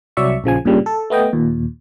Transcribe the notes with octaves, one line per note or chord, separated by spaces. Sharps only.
C2 F#3 D5 E5 C#6
A#1 C#3 F3 G#5
G2 A#2 C#3 G3
A4
A3 B3 D#5 G5
D#2 A#2